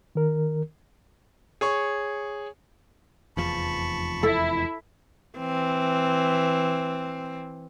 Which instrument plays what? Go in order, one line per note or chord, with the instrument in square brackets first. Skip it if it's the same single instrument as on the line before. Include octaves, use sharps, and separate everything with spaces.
[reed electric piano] D#3 A#4
[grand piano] G#4 C#5 C#6
[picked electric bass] F1 E2 F3 [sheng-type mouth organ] A5 B5 C#6
[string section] E4 [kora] A4
[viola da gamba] E3 C4